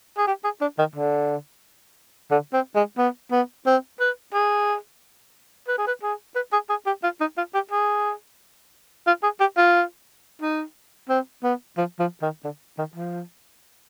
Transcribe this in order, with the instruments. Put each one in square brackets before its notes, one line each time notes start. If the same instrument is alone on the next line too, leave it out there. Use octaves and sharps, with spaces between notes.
[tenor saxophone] G#4
G4
G#4
D4
D#3
D3
D3
C4
G#3
B3
B3
C4
B4
G#4
B4
G#4
B4
G#4
B4
G#4
G#4
G4
F4
D#4
F4
G4
G#4
F4
G#4
G4
F4
D#4
C4
B3
F3
F3
D#3
D3
D#3
F3